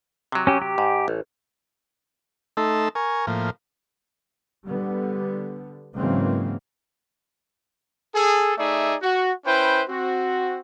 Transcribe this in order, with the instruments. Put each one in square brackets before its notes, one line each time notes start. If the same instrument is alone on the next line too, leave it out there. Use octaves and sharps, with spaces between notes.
[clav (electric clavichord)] C3 F#3
[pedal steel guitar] C#4 G4
G4
[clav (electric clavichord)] G#2
A1
[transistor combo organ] A3 D#4 A4 C6 E6
A#4 G#5 C#6
A2 F3 A#3
[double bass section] D3 G3 B3
G#2 C#3 E3 F#3 A#3 C4
[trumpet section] G#4 A4
A3 D#4 G#4 D5 E5
F#4
C#4 E4 B4 C5 G5
C4 F#4